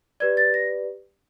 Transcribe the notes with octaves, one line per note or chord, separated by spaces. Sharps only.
G4 B4 D5 G#6
A6
A#6